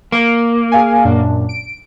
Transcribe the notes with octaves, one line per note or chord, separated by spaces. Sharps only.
A#3
G#4 F5 G#5
F#2 A#2 D4
D7